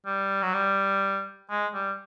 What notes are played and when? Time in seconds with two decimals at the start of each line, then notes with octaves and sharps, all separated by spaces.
0.06 G3
0.42 F#3
0.54 G3
1.50 G#3
1.74 G3